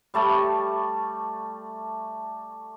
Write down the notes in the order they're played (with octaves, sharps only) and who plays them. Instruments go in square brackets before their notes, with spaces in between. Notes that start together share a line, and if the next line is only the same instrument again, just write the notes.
[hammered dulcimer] G3 A3 A5 C#6